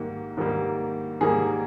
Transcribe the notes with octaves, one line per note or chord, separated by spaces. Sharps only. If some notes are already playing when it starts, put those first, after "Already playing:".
Already playing: G#2 D#3 G3 A#3
G#2 D#3 G3 A#3
G#2 D#3 G3 A#3 G#4